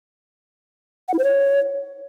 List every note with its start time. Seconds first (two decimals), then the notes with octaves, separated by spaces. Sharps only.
1.08 F#5
1.14 E4
1.19 C5
1.24 C#5